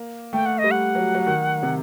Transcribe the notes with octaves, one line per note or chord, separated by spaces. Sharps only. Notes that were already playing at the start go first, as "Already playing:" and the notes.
Already playing: A#3
A3 G5
F#5
D#5
G3
F#5
F#3
F#3
D#3
C3